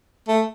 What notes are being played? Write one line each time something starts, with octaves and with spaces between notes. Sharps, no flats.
A3